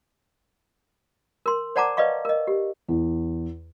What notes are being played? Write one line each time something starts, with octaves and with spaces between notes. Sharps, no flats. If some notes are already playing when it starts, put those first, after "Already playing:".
A#4 C6
C5 D5 F#5 A5 A#5 D6
B4 D5 D#5 F5 C#6
A#4 D#5
G4
E2